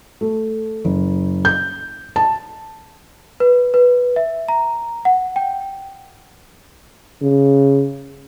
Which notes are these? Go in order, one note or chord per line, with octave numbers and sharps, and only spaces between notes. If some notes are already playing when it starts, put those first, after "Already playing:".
A3
F#1
G6
A5
B4
B4
E5
A#5
F#5
G5
C#3